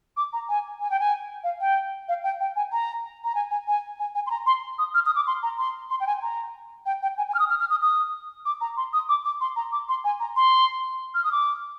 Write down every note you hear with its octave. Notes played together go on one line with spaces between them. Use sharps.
D6
A#5
G#5
G#5
G5
G#5
F5
G5
F5
G5
G5
G#5
A#5
A#5
G#5
G#5
G#5
G#5
G#5
C6
A#5
C6
D#6
F6
D#6
D6
C6
A#5
C6
C6
G5
G#5
A#5
G5
G5
G#5
G#5
F6
D#6
F6
F6
D#6
D#6
D6
A#5
C6
D#6
D6
D6
C6
A#5
D6
C6
G#5
A#5
C6
F6
D#6
D6